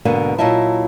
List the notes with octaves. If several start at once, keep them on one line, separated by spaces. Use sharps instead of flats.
G#2 B2 D3 A#3 B3
A#2 F#3 E4 D#5 E5 A5